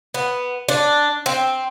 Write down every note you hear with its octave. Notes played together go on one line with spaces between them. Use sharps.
B3
D4
C4